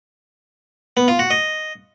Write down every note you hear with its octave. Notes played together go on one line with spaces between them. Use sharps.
B3
F4
F#4
D#5